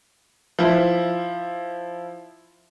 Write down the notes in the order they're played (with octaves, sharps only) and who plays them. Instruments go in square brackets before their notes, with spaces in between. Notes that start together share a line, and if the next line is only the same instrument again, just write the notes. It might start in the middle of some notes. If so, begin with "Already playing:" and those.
[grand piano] F3 E4